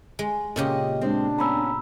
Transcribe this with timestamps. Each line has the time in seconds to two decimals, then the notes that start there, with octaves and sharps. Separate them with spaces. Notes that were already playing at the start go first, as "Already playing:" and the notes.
0.19 G#3
0.56 A#2 C#3 G4 D#5
1.01 G#3 C4 D4
1.38 B3 C#4 A#5 B5 E6